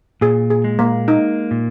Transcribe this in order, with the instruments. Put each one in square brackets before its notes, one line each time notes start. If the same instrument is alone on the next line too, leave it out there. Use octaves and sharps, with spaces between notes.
[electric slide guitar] A#2 [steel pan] G#4
[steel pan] G#4
[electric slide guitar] G#3
[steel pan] A#3
[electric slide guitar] A#3 [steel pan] D#4
[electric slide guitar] A#2